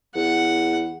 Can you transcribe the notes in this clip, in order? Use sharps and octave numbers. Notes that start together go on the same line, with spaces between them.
E2 F#5